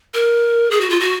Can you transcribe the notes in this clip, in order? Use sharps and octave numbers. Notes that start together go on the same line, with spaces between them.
A#4
G#4
F#4
F4
F#4